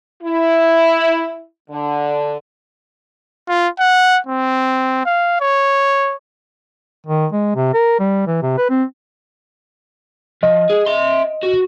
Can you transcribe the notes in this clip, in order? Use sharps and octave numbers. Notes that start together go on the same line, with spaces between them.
E4
D3
F4
F#5
C4
F5
C#5
D#3
G#3
C3
A#4
G3
E3
C3
B4
C4
F3 D#5
G#4
E5 C6
F#4